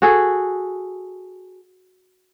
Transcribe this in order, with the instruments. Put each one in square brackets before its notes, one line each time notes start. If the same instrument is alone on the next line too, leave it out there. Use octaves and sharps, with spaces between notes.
[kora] F#4 G#4 A4